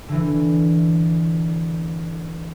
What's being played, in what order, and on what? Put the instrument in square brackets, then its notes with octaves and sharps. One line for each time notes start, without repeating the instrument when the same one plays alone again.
[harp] D3 E3